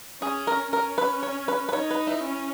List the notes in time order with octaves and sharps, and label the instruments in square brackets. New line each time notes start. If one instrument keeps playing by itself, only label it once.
[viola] C#4 [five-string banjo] G#4
[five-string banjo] A#4
[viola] C#4 [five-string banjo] A#4
[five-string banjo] B4
C#5
B4
B4
[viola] D#4 [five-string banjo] C#5
[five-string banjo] B4
E4
[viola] C#4